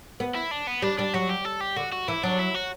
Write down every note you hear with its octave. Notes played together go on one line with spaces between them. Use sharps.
B3
E4
D4
B3
G3 D4
G3 D4
F#3 F#4
G4
A4
G4
D3 F#4
F#4
E3 E4
F#3 D4
E4
F#4